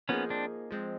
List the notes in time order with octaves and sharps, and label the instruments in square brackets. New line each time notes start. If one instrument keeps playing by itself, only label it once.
[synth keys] F3 A#3 D#4 G#4 [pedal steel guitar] B3 C#4
[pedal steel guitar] C4 D4
[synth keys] F3 G#3 C4